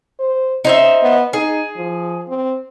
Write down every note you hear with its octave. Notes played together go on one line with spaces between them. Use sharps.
C5
C#3 D#4 C5 E5
B3
D#4 G#4
F3
C4